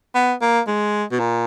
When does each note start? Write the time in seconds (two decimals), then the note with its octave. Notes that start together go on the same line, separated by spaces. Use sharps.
0.15 B3
0.41 A#3
0.67 G#3
1.11 B2
1.19 A#2